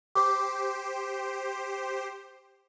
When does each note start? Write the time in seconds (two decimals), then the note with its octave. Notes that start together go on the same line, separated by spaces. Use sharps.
0.15 G4 C5 D6